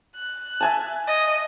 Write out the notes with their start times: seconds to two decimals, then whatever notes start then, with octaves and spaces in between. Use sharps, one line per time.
0.15 F#6
0.60 E5 G#5 A5
1.07 D#5